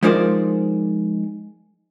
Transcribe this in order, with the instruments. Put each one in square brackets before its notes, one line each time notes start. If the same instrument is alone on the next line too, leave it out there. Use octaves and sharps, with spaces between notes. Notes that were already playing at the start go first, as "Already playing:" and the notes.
[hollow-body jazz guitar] F3 G#3 D#4 A#4 C5 D5